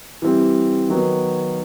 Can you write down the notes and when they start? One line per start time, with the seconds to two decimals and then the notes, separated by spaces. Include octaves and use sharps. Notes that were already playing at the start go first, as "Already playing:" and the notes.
0.22 E3 G3 C4
0.89 D#3 F#3 B3